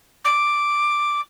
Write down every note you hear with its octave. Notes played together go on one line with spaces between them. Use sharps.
D6